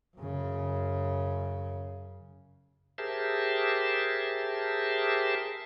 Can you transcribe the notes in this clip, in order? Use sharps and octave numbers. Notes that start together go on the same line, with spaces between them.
F#2 C#3
G4 G#4 A#4 C5 E5 A5